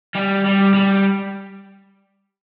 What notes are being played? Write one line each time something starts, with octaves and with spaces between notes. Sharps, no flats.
G3
G3
G3